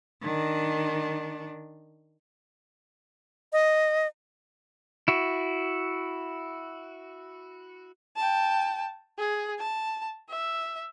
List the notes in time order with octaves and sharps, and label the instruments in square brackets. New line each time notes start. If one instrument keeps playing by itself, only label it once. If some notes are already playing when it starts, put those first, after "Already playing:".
[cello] D#3 D4
[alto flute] D#5
[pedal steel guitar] E4 F#4
[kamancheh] G5 A5
G#4
A5
E5